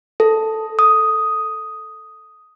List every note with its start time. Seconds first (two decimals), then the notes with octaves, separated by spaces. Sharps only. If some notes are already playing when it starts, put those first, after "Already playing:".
0.20 A4
0.79 D#6